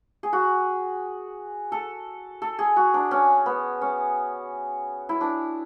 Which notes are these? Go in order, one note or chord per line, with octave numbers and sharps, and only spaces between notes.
G#4
F#4
A4
A4
G#4
F#4
D4
C#4
B3
C#4
E4
D4